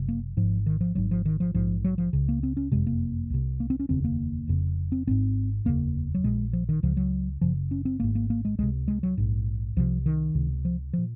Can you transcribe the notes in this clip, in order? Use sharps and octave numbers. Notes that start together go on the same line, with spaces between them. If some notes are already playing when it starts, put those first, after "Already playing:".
Already playing: F#1 C3
A#3
G#1 G#2 F3
D#3
F3
G#1 G#2 F#3
F3
D#3
F3
A#1 G#2 F3
F#3
F3
C#2 C#3
A#3
C4
C#4
F#1 F2 C3 G#3
A#3
C2 C3
A#3
C4
C#4
F1 D#2 C#3 C4
A#3
F1 F2 C#3
C4
G#1 G#2 C4
F1 D#2 C#3 A#3
F#3
A#1 A#2 G#3
F3
D#3
C#2 C#3 F3
F#3
F#1 F#2 C#3 F3
C#4
C4
G#1 G#2 A#3
A#3
A#3
G#3
C#2 C3 G#3
G#3
F#3
A#1 G#2
C2 C3 F3
D#3
C#2 C3
F3
A#2 F3